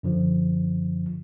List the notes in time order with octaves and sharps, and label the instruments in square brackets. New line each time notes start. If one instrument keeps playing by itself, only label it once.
[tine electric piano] F#2 D3 F3